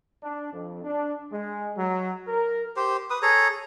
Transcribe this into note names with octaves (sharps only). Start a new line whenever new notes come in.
D4
F2
D4
G#3
F#3
A#4
G4 C5
B4 D#6
G#4 A4 C#5 A#5